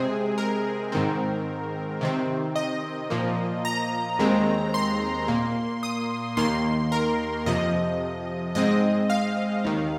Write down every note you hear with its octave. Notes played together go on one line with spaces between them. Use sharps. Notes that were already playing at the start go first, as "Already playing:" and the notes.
Already playing: C3 G#3 C4 G#4
A#4
G#2 D#3 C4
C3 D#3 C4
D#5
A#2 F3 A#3
A#5
D#2 D#3 G#3 C4
C6
A#2 A#3
D#6
D#2 D#3 A#3 C6
A#4
F2 C3 F3 D#5
G#2 G#3 C4 D#5
F5
D#2 D#3